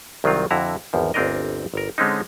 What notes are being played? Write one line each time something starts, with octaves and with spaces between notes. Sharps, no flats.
C2 D#3 F#3 C4 F4
F2 D3 E4 F#4 A#5
G#1 E2 F3
G1 D2 C4 D4 A#4 D#5
G1 A#4
D3 G#3 C4 C#4 D#4